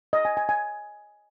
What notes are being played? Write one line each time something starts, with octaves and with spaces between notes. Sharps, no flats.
D#5
G#5
G#5
G#5